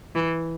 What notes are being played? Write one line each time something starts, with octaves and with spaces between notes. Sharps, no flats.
E3